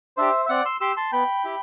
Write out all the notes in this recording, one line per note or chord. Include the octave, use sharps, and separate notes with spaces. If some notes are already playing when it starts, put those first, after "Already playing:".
D4 G4 C5 E5
E5
C4 D5 F#5
C6 E6
G4 C6 E6
A5 C6
B3 G5 B5
E4 G4